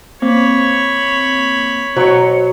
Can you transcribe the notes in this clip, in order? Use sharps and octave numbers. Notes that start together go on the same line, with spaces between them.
A#3 C4 C#5 B5
B2 F#3 C5 C#7